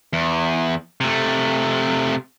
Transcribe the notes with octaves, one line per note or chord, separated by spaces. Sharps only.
E2
C3 A3